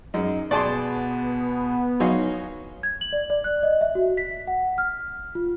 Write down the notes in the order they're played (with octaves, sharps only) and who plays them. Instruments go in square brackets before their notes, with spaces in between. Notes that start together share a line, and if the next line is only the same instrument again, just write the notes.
[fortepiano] F#2 G#3 [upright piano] D#4
[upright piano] B2 G#4 [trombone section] B3 [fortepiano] D5 A5 C6
[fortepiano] F#3 D#4 F5 [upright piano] C#5 G#5 C6
[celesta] G#6
F#7
D5
D5
F#6
D#5
E5
F#4
B6
F#5
F6
F4